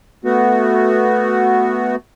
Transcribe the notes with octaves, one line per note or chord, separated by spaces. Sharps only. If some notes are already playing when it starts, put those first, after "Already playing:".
A3 B3 F#4